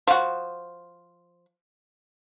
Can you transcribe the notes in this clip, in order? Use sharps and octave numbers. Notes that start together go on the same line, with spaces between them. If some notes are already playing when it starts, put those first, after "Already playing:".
F3 F#4